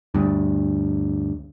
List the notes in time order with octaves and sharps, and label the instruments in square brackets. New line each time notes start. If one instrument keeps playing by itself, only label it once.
[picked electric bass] D2 G2